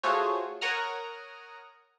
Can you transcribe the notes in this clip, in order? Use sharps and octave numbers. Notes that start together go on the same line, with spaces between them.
A3 F4 F#4 G#4 C5 C#5
A#4 C#5 F#5 A#5 D#6 F6